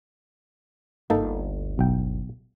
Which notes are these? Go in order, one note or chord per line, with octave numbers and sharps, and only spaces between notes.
G1 D2 A#3 D#4 A4
B1 G5